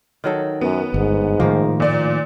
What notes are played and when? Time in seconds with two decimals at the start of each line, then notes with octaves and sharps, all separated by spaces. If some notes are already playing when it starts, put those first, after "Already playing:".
0.24 D#3 F#3 A4
0.61 F#2 B3
0.94 G1 G#2
1.40 A2 D#3 F3 A#3
1.80 A#2 D5